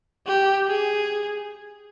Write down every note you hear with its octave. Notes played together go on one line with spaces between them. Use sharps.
G4
G#4